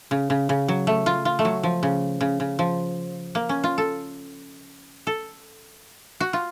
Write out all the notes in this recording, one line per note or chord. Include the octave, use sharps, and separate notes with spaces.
C#3
C#3
C#3
F#3
A3
F4
F4
A3
F#3
F3
C#3
C#3
C#3
F3
A#3
C#4
F4
A4
A4
F#4
F4